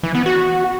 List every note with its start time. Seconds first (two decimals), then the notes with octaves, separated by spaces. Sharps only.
0.03 E3
0.15 B3
0.26 F#4